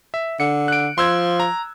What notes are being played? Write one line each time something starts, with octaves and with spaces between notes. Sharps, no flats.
E5
D3 C#7
F#6 D7
F3 C6 E6 G#6
A#5